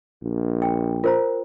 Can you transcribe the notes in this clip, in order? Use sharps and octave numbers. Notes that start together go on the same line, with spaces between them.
A#1
G5
F4 A#4 C5 A#5